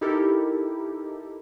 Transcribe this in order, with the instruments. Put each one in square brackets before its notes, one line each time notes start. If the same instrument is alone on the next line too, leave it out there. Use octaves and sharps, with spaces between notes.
[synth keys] D#4 E4 G4 A4 A#4